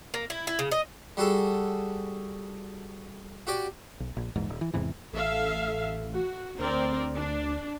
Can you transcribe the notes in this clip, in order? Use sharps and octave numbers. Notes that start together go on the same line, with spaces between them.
A#3
E4
E4
C#3
D#5
G3 F#4 G#4 A4
F#4 G4 D5
B1
A#1
A#1 E2 G#2
D#1
E3
E2 G#2 C3 E3
A1 A4 E5 F5
F#4
D2 C4 A#4 D5
D4